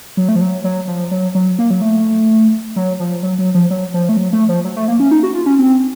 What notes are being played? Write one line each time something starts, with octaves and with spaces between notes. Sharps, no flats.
F#3
A3
F3
F#3
F#3
F3
F#3
F#3
A#3
F#3
A3
F#3
F3
F#3
F#3
F3
F#3
F3
A3
F#3
A3
F3
F#3
A3
A#3
C#4
D#4
F#4
F4
C#4
C4